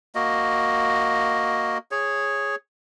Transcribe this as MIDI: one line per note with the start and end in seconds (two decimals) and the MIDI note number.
0.15 1.78 58
0.15 1.78 66
0.15 1.78 75
1.91 2.55 68
1.91 2.55 73